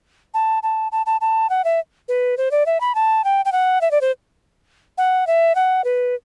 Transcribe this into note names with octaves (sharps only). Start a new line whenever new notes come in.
A5
A5
A5
A5
A5
F#5
E5
B4
C5
D5
E5
B5
A5
G5
G5
F#5
E5
D5
C5
F#5
E5
F#5
B4